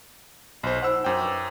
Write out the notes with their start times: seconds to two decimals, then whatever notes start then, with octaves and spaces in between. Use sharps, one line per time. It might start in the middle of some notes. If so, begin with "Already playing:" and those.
0.63 B1 F4 C5
0.82 D#4 F4 C5 F#5 E6
1.04 F#2 D4 C5 G5 D6
1.21 B4 C#6 D6